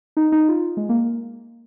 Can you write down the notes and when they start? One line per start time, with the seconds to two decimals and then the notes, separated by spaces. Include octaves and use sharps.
0.17 D#4
0.32 D#4
0.49 F4
0.77 G#3
0.89 A#3